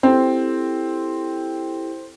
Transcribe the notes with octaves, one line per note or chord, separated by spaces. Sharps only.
C4 E4 G4 A4